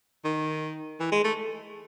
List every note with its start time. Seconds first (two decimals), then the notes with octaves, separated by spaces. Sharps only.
0.25 D#3
1.00 E3
1.12 G#3
1.24 A3